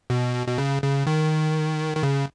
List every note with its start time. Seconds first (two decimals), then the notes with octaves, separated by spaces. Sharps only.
0.10 B2
0.47 B2
0.58 C#3
0.82 C#3
1.07 D#3
1.97 D#3
2.03 C#3